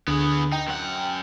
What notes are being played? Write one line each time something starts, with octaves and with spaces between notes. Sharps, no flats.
D2 D3 B3 G#4
D#4 G5
F#2 F#5